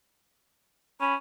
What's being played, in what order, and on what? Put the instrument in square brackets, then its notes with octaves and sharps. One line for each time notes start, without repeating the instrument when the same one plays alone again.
[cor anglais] C#4 [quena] B5